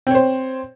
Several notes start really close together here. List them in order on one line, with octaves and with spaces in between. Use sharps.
C4 C#5 C5